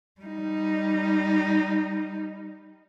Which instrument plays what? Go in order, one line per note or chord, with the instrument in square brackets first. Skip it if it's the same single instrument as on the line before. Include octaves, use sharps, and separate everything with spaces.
[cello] G3 D#4